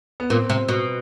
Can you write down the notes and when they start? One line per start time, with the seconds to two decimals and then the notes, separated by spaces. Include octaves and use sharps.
0.20 B3
0.30 A#2 C4
0.50 C3
0.68 B2